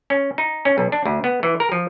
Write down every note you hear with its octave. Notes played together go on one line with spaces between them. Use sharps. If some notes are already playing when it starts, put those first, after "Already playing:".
C#4
D#4
C#4
B1
D4
D2
B3
E3
A#4
F3